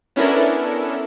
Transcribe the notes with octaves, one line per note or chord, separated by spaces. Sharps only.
B3 C#4 D4 E4 A4 A#4